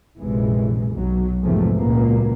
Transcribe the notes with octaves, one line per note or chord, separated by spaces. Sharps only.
A#1 F#2 C3 E3 G#3
B1 F#3
E2 G#2 C3 F3 G#3 A3
C#2 A#2 F3 F#3 A#3 B3